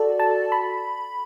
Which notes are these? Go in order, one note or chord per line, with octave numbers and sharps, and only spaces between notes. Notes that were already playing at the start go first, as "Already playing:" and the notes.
Already playing: F#4 A4 D5
A5
B5